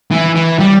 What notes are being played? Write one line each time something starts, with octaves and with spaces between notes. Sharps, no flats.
E3
E3
G3